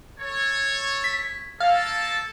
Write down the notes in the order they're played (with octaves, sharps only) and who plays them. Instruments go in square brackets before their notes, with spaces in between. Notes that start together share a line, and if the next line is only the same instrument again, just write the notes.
[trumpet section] A4 C#5
[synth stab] B6
[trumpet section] A#3 A4 A5 [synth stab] F5